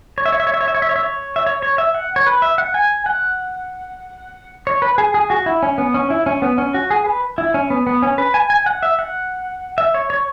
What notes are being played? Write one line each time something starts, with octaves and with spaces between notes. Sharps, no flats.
C#5
E5
C#5
E5
C#5
E5
C#5
E5
C#5
E5
C#5
E5
C#5
E5
C#5
C#5
E5
F#5
C#5
B4
E5
F#5
G#5
F#5
C#5
B4
G#4
G#4
F#4
E4
C#4
B3
C#4
E4
C#4
B3
C#4
F#4
G#4
B4
E4
C#4
B3
B3
C#4
B4
G#5
G#5
F#5
E5
F#5
E5
C#5
C#5